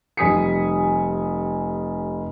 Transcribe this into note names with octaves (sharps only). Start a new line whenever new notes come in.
F1 G3 G#5 D#6 B6 C#7